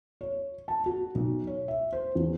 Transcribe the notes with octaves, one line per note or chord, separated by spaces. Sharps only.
C#5
A5
F#4
B1
C#5
E5
C5
E2